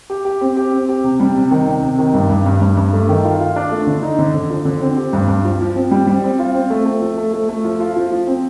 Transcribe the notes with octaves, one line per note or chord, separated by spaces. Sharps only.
G4
G4
C4
G4
C4
G4
C3
G3
C3
D#3
C3
C3
D#3
G2
G2
G2
G2
G2
A3
D#3
F4
F4
D4
A3
D3
D#4
D3
D3
F3
D3
C4
G4
G2
G2
F3
F3
C4
G3
G3
C4
F4
C4
A3
A3
F3
A3
A3
A3
F3
F4
F3
F3
C4